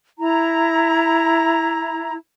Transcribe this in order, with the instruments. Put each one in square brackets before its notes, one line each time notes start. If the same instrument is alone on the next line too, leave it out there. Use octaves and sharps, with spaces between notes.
[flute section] E4 A#5